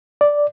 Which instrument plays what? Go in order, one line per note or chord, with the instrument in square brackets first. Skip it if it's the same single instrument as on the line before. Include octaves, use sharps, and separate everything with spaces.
[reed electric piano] D5